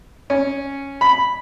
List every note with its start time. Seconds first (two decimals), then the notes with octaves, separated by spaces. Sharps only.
0.30 C#4
1.01 B5